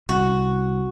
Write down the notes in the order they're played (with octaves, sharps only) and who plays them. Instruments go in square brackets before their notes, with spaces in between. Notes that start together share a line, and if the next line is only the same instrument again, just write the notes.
[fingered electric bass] C2 [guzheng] F#4